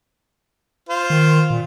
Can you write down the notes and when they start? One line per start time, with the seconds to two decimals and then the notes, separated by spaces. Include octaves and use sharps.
0.89 F4 C5
1.10 D#3
1.50 A#2